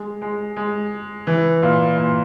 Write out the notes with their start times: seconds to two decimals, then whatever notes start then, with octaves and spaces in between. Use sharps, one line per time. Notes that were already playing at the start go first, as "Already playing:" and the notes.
Already playing: G#3
0.22 G#3
0.56 G#3
1.27 E3
1.62 A#2
1.97 A#2